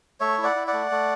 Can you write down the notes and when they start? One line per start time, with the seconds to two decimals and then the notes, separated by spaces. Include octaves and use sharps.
0.20 A3 C#5 E5
0.38 E4
0.43 D5 F#5
0.56 E4
0.67 D5 F#5
0.73 A3
0.91 A3